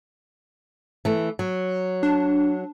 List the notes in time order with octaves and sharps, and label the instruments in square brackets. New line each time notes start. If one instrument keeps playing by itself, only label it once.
[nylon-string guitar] E3 A3
F#3
[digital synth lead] D4